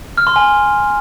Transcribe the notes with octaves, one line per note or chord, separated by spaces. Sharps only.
F6
C6
G#5